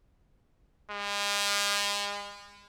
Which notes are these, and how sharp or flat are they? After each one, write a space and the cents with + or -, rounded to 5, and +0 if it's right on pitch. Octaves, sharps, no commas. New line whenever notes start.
G#3 -40